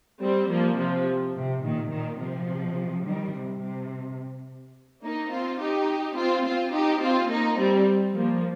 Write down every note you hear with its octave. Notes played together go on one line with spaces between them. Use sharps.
G3 C4
F3 A#3
C3 F3
C3
A#2 D#3
A#2 D#3
C3 F3
D#3 G3
C3
C3
A#3 D#4
C4 F4
D#4 G4
C4 F4
C4 F4
D#4 G4
C4 F4
A#3 D#4
G3 C4
F3 A#3